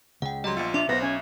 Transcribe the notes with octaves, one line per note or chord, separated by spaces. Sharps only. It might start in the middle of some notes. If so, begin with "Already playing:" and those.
C#2 F#5 G5
F#3 G3 D#5 A#5 C6
A#1 B3 F4 C#7
D4 E5 D6 F7
B1 B3 C5 A#6
C#4 G#5